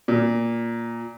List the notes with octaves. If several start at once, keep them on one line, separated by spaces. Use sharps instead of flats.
A#2